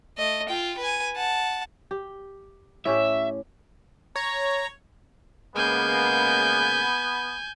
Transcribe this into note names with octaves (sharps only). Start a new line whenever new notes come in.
A3 D#5
F4 G5
B4 G#5
F#5 A5
G4
A2 C#4 G4 E5
C#5 A#5
C#3 G#3 A#3 B3 G#5 G6